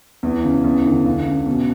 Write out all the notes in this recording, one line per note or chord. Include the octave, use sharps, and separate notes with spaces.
E2
C#3
E2
D3
C#2
C#3
B2